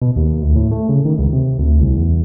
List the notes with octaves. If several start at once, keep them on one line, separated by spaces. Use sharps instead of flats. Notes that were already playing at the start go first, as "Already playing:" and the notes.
B2
D#2
D2
A2
A3
C#3
D#3
C#2
C3
D2
C2
E2